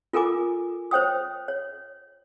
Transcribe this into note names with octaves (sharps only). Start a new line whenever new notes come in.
F4 A4 A#4 G#5 D6
C5 C#5 G5 D#6
C#5